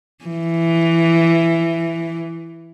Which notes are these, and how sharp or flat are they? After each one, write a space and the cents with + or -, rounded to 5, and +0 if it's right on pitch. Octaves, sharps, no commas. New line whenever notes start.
E3 +10